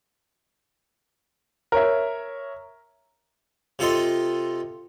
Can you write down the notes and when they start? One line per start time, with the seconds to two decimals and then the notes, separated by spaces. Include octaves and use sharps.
1.72 A#4 C#5 E5
3.79 C3 F4 A4 D#5 C6